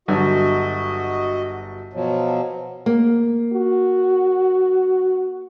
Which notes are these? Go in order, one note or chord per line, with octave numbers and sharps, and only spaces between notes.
G1 F#3 D4 F#4 D#5
B2 F3 F#3
A#3
F#4